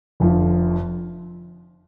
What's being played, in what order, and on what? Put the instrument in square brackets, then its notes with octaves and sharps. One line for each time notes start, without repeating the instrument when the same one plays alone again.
[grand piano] F1 F2 D3 F3